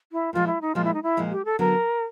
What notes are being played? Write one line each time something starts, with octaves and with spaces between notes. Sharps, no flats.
E4
A#2 F3 G#3 F4
E4
D#4
A#2 F3 G#3 F4
E4
D#4
E4
A#2 F3 G#3
G4
A4
D3 F#3 B3 A#4